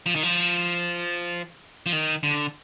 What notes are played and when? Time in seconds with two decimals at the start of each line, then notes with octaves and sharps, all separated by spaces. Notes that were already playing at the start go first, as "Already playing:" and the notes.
0.06 F3
0.15 D#3
0.23 F3
1.86 F3
1.92 D#3
2.23 D3